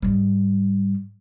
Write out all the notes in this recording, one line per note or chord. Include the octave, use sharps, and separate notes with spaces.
G#2 G3